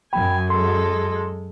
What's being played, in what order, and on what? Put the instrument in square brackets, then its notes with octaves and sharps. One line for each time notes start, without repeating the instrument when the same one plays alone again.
[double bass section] F#2 [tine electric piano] G5 B5 [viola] G#5
[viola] G#3 A4 [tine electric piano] C6